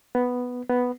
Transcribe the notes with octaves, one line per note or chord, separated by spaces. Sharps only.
B3
B3